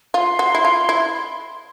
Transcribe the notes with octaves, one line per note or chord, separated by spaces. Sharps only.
F4 C6
F#4
E4
F4
E4